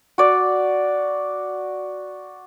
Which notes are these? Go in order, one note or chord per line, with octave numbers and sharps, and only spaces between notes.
F#4 D5